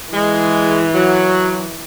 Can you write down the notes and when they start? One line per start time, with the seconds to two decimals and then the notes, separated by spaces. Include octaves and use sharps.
0.14 E3 G#3
0.93 F#3